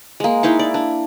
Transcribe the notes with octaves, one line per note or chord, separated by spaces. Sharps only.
G#3 A#3
D#4 E4 F5 C#6
D5
D4